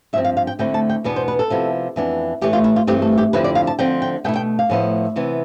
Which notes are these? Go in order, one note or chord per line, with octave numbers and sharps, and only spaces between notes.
G2 F3 C4 E5
F5
F5
G5
D2 D3 A3 C4 E4 G5
A5
G5
E2 B2 B3 D4 B4
C5
B4
A4
C3 F3 B3 E4
F2 E3 B3 D4
A2 E3 A3 G4
F4
E4
F4
G2 E3 A3 C4 G4
A4
G4
F2 D3 F3 C4 E4 B4
D5
F5
A5
D3 F3 C4 G5
G5
B2 A3 E4 G5
G5
F5
A2 F3 B3 E4
C3 E3 B3 E4